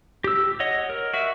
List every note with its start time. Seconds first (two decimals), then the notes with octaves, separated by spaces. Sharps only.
0.24 G4 E6
0.60 C#5 D#5 F#5
0.90 A#4
1.14 F#4 E5